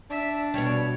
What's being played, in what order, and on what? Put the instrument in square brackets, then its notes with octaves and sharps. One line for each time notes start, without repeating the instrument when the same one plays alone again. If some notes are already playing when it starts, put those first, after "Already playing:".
[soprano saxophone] D4 [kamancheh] E5
[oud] B2 G3 [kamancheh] C#5